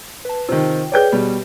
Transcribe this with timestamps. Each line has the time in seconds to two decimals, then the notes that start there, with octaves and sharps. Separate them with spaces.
0.25 B4 A5
0.49 C3 D#3 F4 G5
0.92 G#4 B4 C#5 D5 G5 G6
1.12 B2 G3